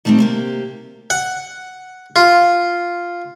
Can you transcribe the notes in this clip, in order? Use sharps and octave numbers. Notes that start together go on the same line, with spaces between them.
D#3 G3 A3 A#3 C4
C3 A#3 G4
F#5
F4